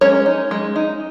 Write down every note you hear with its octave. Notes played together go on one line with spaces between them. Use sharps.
G#3 C#4 C#5
D#4
G#3
D#4